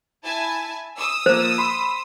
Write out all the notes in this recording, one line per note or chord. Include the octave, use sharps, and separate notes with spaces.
E4 G#5 A5
D#6 E6
F3 A#3 C5
B5 C6